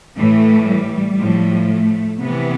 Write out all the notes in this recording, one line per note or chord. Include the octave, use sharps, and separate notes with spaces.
A2 E3 A3
G3
A2 F3
A3
C3 E3 B3